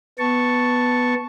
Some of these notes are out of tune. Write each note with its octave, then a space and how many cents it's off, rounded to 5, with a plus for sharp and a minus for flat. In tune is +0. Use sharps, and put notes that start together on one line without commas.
B3 +0 A5 +0 C#6 +0